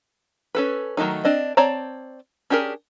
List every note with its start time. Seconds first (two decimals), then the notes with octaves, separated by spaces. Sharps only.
0.55 C#4 A4 B4
0.97 D#3 F#3 G#3 A3 D#4
1.25 C4 D4 D#5
1.57 C4 C#5 D5 A5 A#5
2.50 C#4 D4 G4 G#4 A#4